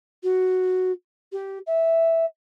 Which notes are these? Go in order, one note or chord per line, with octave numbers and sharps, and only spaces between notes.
F#4
G4
E5